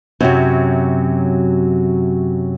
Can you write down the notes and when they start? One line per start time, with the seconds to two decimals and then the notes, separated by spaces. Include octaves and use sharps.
0.21 F#2 C3 F#3